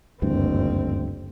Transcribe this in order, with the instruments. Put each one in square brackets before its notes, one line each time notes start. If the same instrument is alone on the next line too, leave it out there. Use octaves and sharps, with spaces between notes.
[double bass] F#1 C4 [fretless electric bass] D2 G2 E3